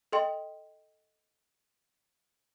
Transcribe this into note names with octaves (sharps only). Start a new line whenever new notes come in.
A4 D#5 G5 C6